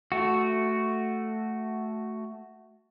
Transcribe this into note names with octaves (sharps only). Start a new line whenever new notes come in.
A3 F#4